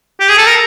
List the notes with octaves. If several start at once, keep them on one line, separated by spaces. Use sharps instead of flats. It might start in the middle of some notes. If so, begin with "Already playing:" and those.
G4
G#4
A4
A#4